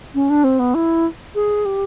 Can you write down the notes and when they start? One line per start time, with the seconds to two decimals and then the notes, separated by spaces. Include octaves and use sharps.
0.15 C#4
0.30 D4
0.44 C4
0.59 B3
0.75 E4
1.35 G#4
1.66 G4